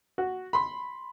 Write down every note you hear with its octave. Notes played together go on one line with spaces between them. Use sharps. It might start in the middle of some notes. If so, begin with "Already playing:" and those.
F#4
B5 C6